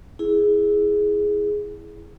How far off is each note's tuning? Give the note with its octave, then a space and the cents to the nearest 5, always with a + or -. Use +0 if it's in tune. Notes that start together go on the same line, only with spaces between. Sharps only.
E4 +0 G#4 +0